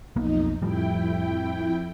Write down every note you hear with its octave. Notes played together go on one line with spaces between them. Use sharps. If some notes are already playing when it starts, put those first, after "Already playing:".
B1 F2 A#3 B3 D#4
F2 A2 F3 G3 E4 G5